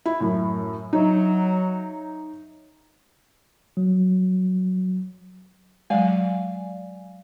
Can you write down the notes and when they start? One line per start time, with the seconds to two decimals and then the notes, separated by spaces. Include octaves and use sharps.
0.06 E4
0.20 F#2 A2
0.93 F#3 D#4 C#5 E5
3.77 F#3
5.90 F#3 G#3 D5 F5 G#5